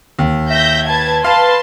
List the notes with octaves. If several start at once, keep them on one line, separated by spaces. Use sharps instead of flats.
D#2
E5 G6 A#6
B4 A5 G#6
B4 F5 A5 C6